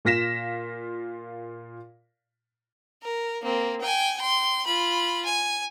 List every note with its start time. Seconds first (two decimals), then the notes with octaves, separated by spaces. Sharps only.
0.05 A#2 F4 A#6 B6 E7
3.02 A#4
3.42 A#3 C4
3.80 G5 G#5
4.17 G5 C6
4.66 F4 B5
5.25 G#5